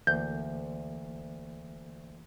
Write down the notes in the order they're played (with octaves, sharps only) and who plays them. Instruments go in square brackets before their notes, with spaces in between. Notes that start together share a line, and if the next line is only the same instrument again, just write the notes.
[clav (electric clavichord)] D2 [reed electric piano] E3 A#3 [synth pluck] G6